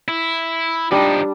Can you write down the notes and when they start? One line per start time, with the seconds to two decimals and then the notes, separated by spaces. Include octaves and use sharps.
0.08 E4
0.91 F3 G3 D4 D#4